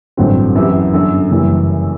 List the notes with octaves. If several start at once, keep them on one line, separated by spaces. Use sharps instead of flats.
A1 G2 D3 F#3 C4
F#2 E3 B3 E4 G4
G1 F#2 D3
F#1 F#2 E3 G3